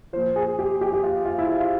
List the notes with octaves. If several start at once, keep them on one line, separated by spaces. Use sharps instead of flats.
A#2 F3 C5
G#4
G4
G4
G4
F4
F4
E4
F4
F4